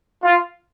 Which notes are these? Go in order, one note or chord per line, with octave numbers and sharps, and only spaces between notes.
F4